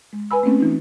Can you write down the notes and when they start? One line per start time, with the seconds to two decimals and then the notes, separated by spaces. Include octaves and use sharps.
0.13 G#3
0.31 B4 G#5 B5 E6
0.43 A3 A#3 C4 C#4
0.58 E3 D#4 F4